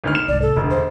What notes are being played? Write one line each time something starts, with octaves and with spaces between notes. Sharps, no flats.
G#1 D2 F6
E7
C2 G#2 D5
A4
E1 D2 G#2
C5